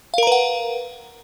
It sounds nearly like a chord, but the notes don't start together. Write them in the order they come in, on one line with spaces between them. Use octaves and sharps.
F5 A#4 A#5 B4 F#5